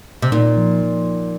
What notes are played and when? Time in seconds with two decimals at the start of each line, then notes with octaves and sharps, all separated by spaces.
0.22 C3
0.32 A#2 D#4
0.57 F3
0.81 F3
1.05 F3